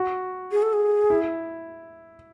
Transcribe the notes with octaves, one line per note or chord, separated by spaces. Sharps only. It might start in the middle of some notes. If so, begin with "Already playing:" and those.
Already playing: F#4
G#4
A4
G#4
E4